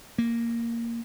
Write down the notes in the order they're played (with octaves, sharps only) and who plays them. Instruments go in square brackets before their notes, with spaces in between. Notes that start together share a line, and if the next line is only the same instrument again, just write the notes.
[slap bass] A#3